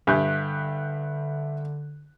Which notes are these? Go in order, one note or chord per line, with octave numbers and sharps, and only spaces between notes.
G2 D3 G4 E5 G#5 F#6 G6